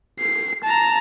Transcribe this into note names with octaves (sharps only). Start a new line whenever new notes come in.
C7
A5 A#5